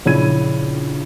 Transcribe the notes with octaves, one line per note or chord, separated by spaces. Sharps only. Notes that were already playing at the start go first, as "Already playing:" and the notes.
A#1 C#3 C#4 E4 G#6 D#7